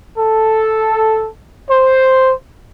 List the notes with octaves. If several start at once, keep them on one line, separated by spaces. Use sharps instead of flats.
A4
C5